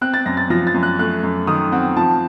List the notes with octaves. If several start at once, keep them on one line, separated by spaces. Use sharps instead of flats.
C4 F#6
A6
F#2 A#6
A6
F3 A#6
A6
F#2
F#6
A3 F#6
F#2
D#3 D#6
C4 F#5
F3 A5